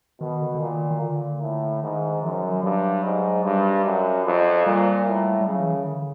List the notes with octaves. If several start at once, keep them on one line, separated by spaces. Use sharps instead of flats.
B2 D#3
D3
D3
A#2 D#3
D#3
A#2 D3
A2
G#2 D#3
F#2 F3
F#3
G2 F#3
G#2
G2 G3
F#2
F2
A#2 G3
A2
G3
C#3 F#3
E3
D#3
D3